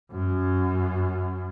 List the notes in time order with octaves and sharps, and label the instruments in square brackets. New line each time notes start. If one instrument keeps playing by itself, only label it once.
[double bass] F#2